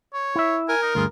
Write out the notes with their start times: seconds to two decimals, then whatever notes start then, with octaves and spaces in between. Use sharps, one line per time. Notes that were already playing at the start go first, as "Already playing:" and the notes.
0.14 C#5
0.36 E4 E5
0.69 A#4 G#5
0.82 D#4
0.95 D2 G2 F4 G#4